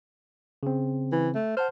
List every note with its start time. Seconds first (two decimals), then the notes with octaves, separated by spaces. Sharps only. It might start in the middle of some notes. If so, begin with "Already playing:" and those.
0.63 C#3 C4
1.12 E3
1.35 A3
1.57 C5 F#5 A5 F6